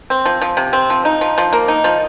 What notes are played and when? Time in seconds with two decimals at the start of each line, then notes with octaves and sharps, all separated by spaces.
0.10 C4
0.25 F3
0.41 F3
0.57 C3
0.73 C4
0.90 F3
1.05 D#4
1.21 F3
1.38 F3
1.53 A#3
1.68 D#4
1.84 F3